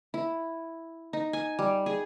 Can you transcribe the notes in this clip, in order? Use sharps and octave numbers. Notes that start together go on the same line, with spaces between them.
E4
D#4
G#5
G3
G#4